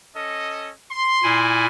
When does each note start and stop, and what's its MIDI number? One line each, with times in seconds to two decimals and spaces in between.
0.15 0.72 61
0.15 0.72 69
0.15 0.72 75
0.91 1.42 84
1.23 1.66 46
1.23 1.66 64
1.23 1.66 80